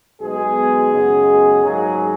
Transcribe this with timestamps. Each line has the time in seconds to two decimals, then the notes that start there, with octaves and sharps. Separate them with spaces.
0.20 B1 B2 G#3 B3 G#4
0.92 F#2 C#3 G#3 B3
1.63 G#2 F#3 A#3 G#4